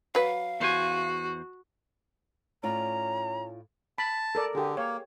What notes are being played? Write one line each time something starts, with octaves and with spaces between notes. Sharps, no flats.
F#3 B4 F5
E2 F#4 C5 G#5
A2 C#4 F4 D5 A#5
A5 B5
A4 A#4 D5
D3 G4 G#4
A#3 C#5